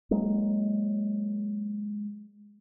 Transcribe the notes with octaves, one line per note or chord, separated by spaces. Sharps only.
F#3 G#3 A#3